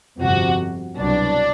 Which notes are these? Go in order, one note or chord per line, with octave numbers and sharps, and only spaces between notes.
G1 F2 C3 F#4
C2 B2 F#3 D4